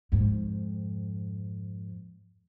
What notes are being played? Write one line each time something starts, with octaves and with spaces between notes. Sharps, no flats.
F2 G#2